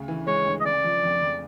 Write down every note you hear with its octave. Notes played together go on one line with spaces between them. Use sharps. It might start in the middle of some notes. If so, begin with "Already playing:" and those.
Already playing: D2 C#3
E3
G#3 C#5
D2
D#5
C#3 D5
F3
F2
F2